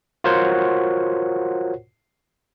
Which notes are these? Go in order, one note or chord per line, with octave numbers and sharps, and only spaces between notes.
F4 F#4 A#4 C5 C#5 F#5